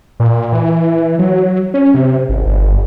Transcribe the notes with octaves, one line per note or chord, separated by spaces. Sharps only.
A#2
E3
F#3
C#4
C3
G#1
G1